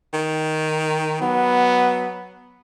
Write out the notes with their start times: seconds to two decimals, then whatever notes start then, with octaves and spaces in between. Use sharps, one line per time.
0.14 D#3
1.22 F#3 B3